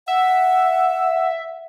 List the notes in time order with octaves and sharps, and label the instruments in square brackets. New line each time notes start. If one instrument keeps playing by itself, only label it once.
[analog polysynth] E5 [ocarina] F#5